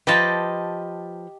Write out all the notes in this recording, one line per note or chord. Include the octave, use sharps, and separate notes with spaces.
F3 G4 B4 D#5 A5